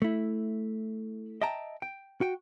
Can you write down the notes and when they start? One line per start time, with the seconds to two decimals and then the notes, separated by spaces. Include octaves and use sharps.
0.02 A3 E4
1.41 D#5 E5 G5 A5 A#5
1.82 G5
2.21 F#4 G5